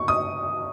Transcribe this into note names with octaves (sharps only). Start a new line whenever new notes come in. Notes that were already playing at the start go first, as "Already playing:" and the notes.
Already playing: C#6
D#6